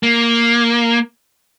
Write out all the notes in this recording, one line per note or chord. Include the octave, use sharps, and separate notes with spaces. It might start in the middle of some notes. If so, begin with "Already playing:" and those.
A#3